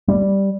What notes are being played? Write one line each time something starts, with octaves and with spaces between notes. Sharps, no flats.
G3